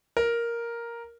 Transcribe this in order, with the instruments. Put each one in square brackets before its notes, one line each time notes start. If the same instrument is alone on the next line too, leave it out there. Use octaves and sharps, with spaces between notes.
[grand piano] A#4